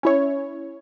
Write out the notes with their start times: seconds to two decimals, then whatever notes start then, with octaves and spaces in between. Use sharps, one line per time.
0.03 C#4 E4 C#5